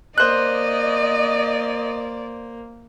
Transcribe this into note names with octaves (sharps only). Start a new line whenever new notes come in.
A#3 C5 D5 D#5 F#6